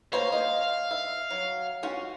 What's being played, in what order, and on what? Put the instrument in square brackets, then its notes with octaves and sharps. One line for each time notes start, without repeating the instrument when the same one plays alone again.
[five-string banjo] A#3 C5 C#5 [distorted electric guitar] F5
[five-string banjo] D#5
E5
F#3
C#4 F4 F#4